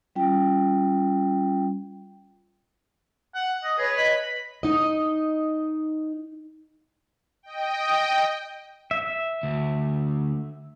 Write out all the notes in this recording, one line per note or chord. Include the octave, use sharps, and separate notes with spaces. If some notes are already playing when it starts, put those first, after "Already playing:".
G3 C#4 F4 G5
F#5
D#5
G#4 B4 C#5
D#5 B5
D#4 D#5
D#5 G5
E5
D2